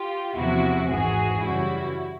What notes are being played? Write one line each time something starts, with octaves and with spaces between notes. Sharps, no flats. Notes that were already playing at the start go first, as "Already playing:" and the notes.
Already playing: F4 G4
E2 C3 F3 E4 F#4
G#1 G#2 E3 F#4 G#4
F#2 C#3 E3 G3 E4 F#4